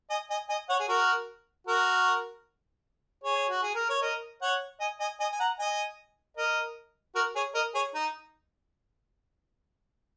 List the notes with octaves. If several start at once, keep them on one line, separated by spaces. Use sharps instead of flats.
D#5 G#5
D#5 G#5
D#5 G#5
C#5 F#5
G#4
F#4 A#4
F#4 A#4
G#4 C#5
F#4
G#4
A#4
C#5
A#4 D#5
C#5 F#5
D#5 G#5
D#5 G#5
D#5 G#5
G#5
F#5 A#5
D#5 G#5
A#4 D#5
F#4 A#4
G#4 C#5
A#4 D#5
G#4 C#5
D#4